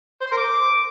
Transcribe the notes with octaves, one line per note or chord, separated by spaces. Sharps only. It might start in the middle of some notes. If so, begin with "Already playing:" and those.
C5
C6
A#4
D6